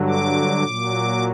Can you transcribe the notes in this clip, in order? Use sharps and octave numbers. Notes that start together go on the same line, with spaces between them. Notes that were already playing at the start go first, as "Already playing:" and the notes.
Already playing: G2 D3 F#3
D6
A#2 F#3